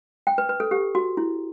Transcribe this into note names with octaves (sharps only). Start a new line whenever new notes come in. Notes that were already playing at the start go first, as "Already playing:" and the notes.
G5
B4
B4
A4
G4
F#4
E4